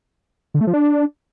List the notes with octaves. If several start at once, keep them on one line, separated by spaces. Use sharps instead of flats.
D3
A3
F3
D4